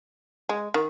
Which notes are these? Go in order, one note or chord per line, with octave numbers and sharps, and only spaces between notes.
G#3
D#3